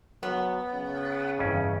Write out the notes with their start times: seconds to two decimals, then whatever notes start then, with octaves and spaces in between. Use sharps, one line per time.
0.23 F#3 B3
0.74 C#3
1.39 G1 F2 E3 C#4